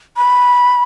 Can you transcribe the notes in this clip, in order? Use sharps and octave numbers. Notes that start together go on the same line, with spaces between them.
B5